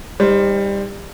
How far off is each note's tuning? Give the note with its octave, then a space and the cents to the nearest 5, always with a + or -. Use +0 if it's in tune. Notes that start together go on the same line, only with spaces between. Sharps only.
G3 +20 D#4 +0 C5 +0